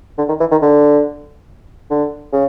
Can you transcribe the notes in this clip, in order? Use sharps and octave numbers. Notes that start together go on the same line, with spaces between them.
D3
D#3
E3
D#3
D3
D3
C#3